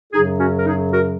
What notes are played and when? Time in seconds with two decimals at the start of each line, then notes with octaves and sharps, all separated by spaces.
0.13 F#2 C#3 F#3 D#4 G#4
0.39 C#4 F#4
0.57 A#4
0.66 D#4 G#4
0.93 F#4 A#4